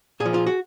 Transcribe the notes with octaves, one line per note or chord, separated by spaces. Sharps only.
A#2 G#4
F3
F4
F#4